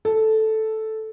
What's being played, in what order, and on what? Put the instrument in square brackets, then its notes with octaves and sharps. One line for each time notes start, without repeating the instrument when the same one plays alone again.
[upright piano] A4